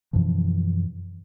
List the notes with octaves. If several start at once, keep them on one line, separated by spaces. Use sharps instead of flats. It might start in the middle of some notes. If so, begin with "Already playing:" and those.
F#2 B2 E3 F3